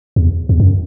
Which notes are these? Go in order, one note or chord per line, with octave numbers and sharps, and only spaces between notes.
E2
E2
F#2